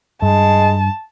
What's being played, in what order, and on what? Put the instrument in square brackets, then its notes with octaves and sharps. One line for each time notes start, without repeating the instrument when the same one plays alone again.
[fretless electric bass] G2 [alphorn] G#3 [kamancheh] A5